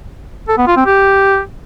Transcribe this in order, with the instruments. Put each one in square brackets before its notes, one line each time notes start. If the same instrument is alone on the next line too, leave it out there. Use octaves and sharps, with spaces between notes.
[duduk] A4
B3
F4
C4
G4